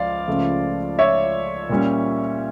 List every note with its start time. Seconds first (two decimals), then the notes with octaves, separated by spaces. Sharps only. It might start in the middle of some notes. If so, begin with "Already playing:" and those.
Already playing: C#2 F3 D5 F5
0.27 C#2 C#3 F3 A3
0.99 C#5 E5
1.69 A#2 G3 C#4